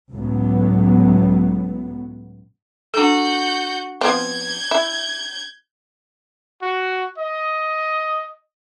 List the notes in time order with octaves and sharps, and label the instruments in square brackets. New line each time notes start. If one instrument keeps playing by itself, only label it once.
[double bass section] C#2 A2 F#3 B3
[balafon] D4 A4 [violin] F#4 G6
[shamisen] F3 B3 C4 [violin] G6 G#6
[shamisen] E4
[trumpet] F#4
D#5